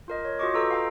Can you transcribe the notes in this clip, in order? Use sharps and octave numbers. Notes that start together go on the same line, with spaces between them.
F4 A#4 D#5
C#5
F4 F#4 G#4 D#5 C#6 D6
F4 A4 B4 D#5 A#5 E6
F5 G5 A#5